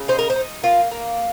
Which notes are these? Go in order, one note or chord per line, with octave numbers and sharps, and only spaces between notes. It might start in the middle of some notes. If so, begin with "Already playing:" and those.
Already playing: C#3
D#4 C5
A#4
C5
D#4
A#3 F4
A#3